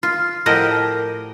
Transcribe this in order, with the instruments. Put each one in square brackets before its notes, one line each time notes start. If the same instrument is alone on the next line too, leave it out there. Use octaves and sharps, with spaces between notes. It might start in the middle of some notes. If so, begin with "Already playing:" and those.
[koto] F4
A2 F3 G4 A#4 D#5 F#5